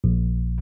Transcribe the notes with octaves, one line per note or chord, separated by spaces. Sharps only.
A#1